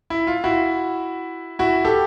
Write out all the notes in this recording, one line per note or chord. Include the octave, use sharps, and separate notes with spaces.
E4
F4
E4 F#4
E4 F#4
G4 A4